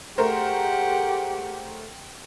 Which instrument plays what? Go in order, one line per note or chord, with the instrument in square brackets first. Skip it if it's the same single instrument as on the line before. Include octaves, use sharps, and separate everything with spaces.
[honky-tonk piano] A3 A#4 C5 [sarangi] G4 [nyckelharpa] G#4 F#5